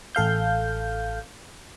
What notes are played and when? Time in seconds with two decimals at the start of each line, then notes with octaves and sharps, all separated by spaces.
0.15 A1 A4 F5 G6